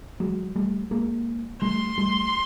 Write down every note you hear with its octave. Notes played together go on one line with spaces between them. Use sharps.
F#3 G#3
G3 A3
G#3 A#3
G3 A3 C6
G3 A3